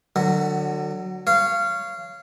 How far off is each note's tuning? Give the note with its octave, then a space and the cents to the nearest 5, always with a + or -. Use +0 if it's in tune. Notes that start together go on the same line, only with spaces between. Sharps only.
D3 +30 F#3 +0
C#5 +0 F5 -20